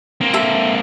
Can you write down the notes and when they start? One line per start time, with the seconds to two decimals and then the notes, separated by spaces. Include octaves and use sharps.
0.21 A#3 C4
0.33 A4 E5 A5